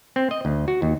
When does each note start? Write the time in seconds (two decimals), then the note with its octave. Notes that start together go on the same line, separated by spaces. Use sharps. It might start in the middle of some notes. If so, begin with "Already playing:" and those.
0.16 C4
0.31 D#5
0.45 D2
0.68 F#4
0.82 D#2